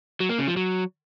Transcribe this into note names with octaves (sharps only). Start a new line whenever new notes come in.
F#3
A#3
C#3
F3
F#3